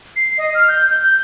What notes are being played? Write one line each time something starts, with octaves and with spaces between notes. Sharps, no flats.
C7
D#5
F6
G6
G6
G6